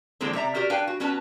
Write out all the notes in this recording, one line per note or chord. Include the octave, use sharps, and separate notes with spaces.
D3 E3 F3 G#3 A#3 C4
C3 D5 E5 A#5
F#4 G4 A#4 D5
D4 B4 F5 G5 G#5
F#4
B3 C#4 F#4 B4 A5